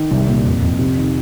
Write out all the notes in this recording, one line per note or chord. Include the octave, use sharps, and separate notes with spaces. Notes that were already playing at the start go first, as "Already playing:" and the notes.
Already playing: D#3
C2
A#2
F2
F2
C3
D#3